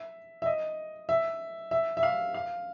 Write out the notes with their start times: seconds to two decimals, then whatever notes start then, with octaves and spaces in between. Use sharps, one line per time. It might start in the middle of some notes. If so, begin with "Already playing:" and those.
Already playing: E5
0.42 E5
0.46 D#5
1.09 E5
1.71 E5
1.97 E5
2.03 F5
2.34 F5